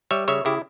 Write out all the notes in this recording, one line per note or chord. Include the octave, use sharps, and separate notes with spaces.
G3 C#5 E5
C#3 C#5 E5
C#3 E4 G4